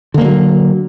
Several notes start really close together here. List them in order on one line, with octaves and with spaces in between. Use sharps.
D3 A#3 G3 F#3